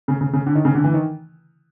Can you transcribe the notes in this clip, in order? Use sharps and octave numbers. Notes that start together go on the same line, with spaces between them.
C#3
C#3
C#3
D3
D#3
C#3
D3
E3
D#3